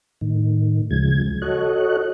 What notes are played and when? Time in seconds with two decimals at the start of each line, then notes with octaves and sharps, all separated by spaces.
0.21 A2 D#3
0.91 D2 C#3 F3 G#3 G#6
1.42 F#4 A4 C#5 D#5 F#6